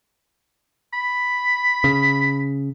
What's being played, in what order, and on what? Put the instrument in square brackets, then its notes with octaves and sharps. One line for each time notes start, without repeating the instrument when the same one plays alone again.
[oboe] B5
[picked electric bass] C#3